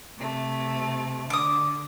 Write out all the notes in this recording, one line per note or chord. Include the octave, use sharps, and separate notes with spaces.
C3 A3
D3 D6 D#6